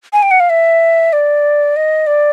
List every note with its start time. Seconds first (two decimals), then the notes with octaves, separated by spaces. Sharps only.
0.13 G#5
0.23 G5
0.31 F#5
0.40 F5
0.50 E5
1.13 D5
1.76 D#5
2.07 D5